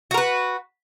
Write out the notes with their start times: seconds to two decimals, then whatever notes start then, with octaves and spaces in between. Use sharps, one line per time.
0.11 F#4
0.14 A#4
0.18 B4